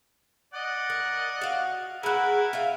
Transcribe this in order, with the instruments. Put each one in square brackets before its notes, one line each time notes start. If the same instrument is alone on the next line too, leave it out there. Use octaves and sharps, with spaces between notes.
[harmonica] D5 D#5 F#5
[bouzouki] A#4
F#4 F5
[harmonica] E4 A#4 B4 [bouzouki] F#4 G#4
[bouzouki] F4 E5 F5